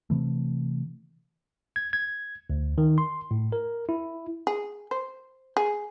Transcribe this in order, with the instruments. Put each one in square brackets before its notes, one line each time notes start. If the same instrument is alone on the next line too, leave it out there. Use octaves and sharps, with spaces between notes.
[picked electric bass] C3 E3 A3
[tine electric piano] G#6
G#6
D2
D#3
C6
A2
A#4
E4
[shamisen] G#4
C5
G#4